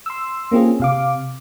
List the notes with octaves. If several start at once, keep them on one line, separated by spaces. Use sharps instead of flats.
C6 E6
A#3 C4 C#4 F4 G#4
C3 F5 D6